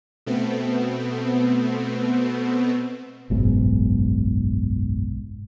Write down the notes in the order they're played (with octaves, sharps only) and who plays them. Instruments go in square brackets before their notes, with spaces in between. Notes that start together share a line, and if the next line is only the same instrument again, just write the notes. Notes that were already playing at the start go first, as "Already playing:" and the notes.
[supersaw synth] B2 A3 B3 C4
[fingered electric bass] F#1 B1 G#2